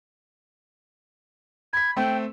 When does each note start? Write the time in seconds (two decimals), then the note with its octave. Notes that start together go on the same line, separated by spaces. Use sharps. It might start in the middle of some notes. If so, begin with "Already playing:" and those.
1.73 B5 G#6 B6
1.97 A3 C4 G5